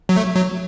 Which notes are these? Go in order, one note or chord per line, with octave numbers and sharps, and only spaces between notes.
F#3
A3
F#3